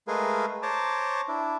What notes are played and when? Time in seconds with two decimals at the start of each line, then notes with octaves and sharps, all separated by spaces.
0.08 G#3 A3 G#4 A#4 B4 F5
0.63 C5 C#5 A5 A#5 D6
1.28 D4 E4